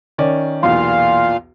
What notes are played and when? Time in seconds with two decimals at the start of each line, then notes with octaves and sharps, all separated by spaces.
0.18 D#3 C#4 D5
0.63 B1 E2 A#2 F4 F5 C6